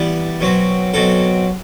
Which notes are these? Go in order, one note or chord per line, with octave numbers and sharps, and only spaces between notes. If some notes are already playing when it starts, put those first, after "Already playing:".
Already playing: E3 G3 B3
B2 F#3 C4
B2 F#3 C4 A4